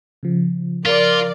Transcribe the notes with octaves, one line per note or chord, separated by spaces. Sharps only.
C#3 F3
F4 A#4 D5